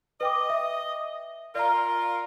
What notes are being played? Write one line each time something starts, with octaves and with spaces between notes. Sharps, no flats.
B4 D#5 G5 D6
E5
F4 A#4 D5 A#5